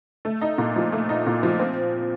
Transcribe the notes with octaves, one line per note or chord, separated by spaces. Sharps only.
A3
D#4
A#2
F3
A3
D#4
A#2
F3
C4